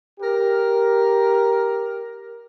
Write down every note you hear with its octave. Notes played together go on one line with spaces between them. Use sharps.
G4 A#4